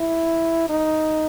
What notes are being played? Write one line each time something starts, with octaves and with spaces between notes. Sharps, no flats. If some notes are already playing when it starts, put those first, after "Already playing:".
Already playing: E4
D#4